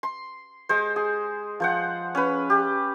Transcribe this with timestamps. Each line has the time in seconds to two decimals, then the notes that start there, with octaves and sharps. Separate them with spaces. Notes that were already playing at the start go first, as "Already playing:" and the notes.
0.03 C6
0.69 G#3 C5
0.96 G#4
1.60 F3 C5 F#5
2.15 C#4 B4
2.50 G4